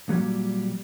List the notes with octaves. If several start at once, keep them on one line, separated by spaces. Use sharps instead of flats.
A#2 F#3 G3